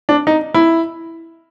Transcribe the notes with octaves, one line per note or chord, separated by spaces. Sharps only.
D4
D#4
E4